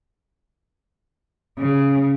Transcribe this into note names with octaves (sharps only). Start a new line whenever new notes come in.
C#3